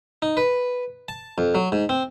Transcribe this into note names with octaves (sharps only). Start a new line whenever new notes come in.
D#4
B4
A5
F2
F#3
G#2
C4